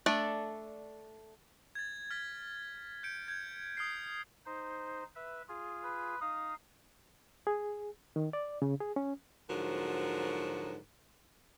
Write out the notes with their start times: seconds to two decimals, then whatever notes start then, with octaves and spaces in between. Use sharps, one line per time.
0.06 A3 D4 A4 D5
1.75 G#6 A6
2.11 F6 A6 B6
3.03 G6 C#7 D7
3.28 G6 G#6
3.77 D#6 F6 G#6 C7
4.46 D#4 C5
5.16 B4 E5
5.49 F4 G#4
5.84 B4
6.21 D#4 F5 D#6
7.47 G#4
8.16 D#3
8.33 D5
8.62 C#3
8.81 G#4
8.96 C#4
9.49 G#2 D3 F3 F#3 F#4 A#4